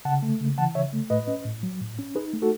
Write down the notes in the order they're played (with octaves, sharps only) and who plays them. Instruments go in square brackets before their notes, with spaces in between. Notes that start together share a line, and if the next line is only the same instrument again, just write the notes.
[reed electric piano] C#3 F#5 A5
A3
C#3
E3 F#5 A5
C#3 C#5 E5
A3
A2 B4 D#5
C#4
A2
F#3
A2
C#4
D#4 G#4 B4
A3
F#4 A4